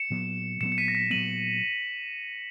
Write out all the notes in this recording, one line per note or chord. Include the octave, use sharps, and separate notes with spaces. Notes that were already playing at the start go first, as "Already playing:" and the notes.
Already playing: C#7 E7
A#2 F#3 B3
A#2 F#3 B3 C#7 E7
C#7
B6 D#7
A#6
B6
A#2 F#3 B3 D#7 F#7